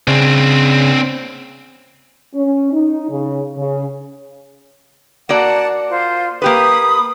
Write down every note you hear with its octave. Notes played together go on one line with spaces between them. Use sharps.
C#3 C4 D4
C#4
D#4
C#3
C#3
A#3 F#4 D5 F#5 A5
F4 C5
A#3 G4 B4 B5 D#6